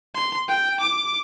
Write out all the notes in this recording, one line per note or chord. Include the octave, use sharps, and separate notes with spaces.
C6
G5
D6